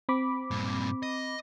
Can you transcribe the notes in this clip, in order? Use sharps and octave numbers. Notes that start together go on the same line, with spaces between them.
C4 B5 D6
G2 A#2
D#5